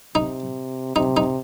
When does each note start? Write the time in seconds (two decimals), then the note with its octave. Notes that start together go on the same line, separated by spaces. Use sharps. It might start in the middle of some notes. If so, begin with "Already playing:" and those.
0.15 C3 D#4
0.96 C3 D#4
1.17 D#4